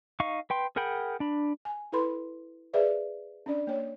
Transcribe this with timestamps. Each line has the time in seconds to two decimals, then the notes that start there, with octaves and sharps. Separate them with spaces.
0.20 D#4 F5 C#6
0.50 B4 G5 C6
0.76 G#4 A#4 F#5 G5 B5
1.20 D4 B5
1.65 G#5
1.92 E4 A4 B4 B5 C6
2.73 G#4 B4 C5 D5 E5 F5
3.46 C#4 D4 D5
3.67 A#3 C#5